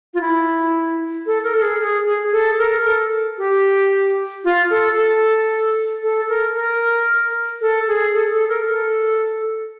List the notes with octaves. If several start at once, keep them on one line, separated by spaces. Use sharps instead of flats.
F4
E4
A4
A#4
A4
G#4
G#4
G#4
A4
A#4
A4
G4
F4
A4
A4
A4
A#4
A#4
A4
G#4
A4
A4
A#4
A4